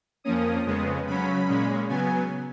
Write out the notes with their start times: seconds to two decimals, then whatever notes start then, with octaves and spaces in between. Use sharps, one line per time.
0.24 F2 F3 A#3 C#4 D#6
0.66 F2 C#3 G#3 B3
1.07 C#3 F#3 C#4 B5
1.48 A#2 G#3 C#4
1.89 C#3 F#3 B3 G#5